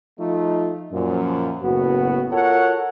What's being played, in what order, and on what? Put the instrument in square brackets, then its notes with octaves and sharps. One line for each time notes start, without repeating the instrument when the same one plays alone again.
[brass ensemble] F3 A3 D#4 F4
F#2 A#2 F3
F#1 A2 B3 F#4
F4 F#4 A4 A#4 C#5 F#5